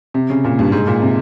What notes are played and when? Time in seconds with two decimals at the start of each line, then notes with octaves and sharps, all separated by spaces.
0.14 C3
0.30 C#3
0.44 A#2
0.59 G2
0.72 G#2
0.87 A#2
1.02 C3